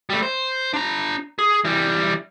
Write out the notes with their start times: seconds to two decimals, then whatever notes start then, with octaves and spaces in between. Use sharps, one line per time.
0.10 G3 A3
0.23 C5
0.73 D4 A#5
1.39 G#4
1.64 E3 G3